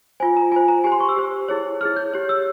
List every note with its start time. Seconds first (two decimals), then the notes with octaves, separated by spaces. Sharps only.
0.20 F4 C5 G#5
0.37 A#5
0.52 F4 C5 G#5
0.68 A#5
0.84 G4 C5 G#5
0.92 C6
1.00 C#6
1.09 E6
1.16 G4 C5
1.48 E4 G#4 C#5
1.81 E4 G#4 C#5 F6
1.96 G6
2.14 G4 C#5
2.29 E6